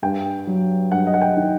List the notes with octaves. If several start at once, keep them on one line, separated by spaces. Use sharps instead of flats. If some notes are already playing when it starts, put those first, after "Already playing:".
G2 G5
F#3
G2 F#5
D#5
F#5
G5
D#3